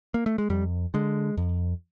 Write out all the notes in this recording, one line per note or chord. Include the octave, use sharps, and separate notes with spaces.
A#3
A3
G#3
F2 G3
D3 G#3
F2